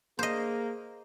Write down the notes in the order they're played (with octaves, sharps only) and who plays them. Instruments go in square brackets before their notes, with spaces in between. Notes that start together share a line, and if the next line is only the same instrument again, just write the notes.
[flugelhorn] A#3 [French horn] G#4 [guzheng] C5 D#5